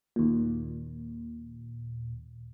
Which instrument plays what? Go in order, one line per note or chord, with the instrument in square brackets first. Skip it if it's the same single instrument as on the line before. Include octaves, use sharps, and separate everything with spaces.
[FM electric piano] D#2 A#2